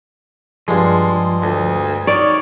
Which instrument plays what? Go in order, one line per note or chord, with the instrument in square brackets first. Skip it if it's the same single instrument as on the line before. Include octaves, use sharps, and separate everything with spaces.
[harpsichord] G2 G#3 [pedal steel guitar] F3
[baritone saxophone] D2
[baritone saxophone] D#3 [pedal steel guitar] C#5 [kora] D5